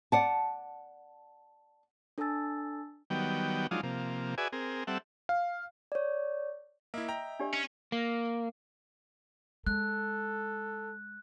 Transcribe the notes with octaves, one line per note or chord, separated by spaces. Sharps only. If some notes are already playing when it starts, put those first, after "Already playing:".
D5 F#5 A5
D4 A4 G#5 A5 E6 A6
D#3 F#3 G3 B3 G5
F3 F#3 G#3 D4 D#4 F4
C3 F3 A#3
F#4 G#4 B4 D5 E5 G#5
C4 G#4 A#4
G3 C4 A4 E5 F#5
F5
C#5 D5
A#3 E4 D#5 E5
G5 A#5
D4 G4 D5
C#4
A#3
G#3 A4 F#6